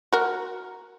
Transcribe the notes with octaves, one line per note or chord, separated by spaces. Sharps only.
F#4 A#4